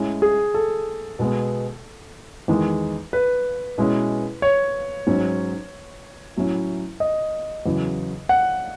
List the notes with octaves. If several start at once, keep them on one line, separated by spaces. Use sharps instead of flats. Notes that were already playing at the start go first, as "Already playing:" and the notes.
Already playing: A2 G#3 C#4
G#4
A4
B2 G#3 B3
E2 D#3 G#3
B4
B2 G#3 C#4 E4
C#5
G#2 F#3 C#4
A2 F#3 C#4 E4
D#5
E2 C#3 F#3
F#5